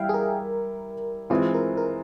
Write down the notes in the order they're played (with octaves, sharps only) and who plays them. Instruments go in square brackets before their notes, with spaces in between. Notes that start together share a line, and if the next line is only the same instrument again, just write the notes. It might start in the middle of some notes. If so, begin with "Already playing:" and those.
Already playing: [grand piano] E3 G3 E4 [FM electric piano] E5 F5 G5
[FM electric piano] G#4
A#4
[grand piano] E3 G#3 C4 F4 [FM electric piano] G#4
[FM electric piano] A#4
A#4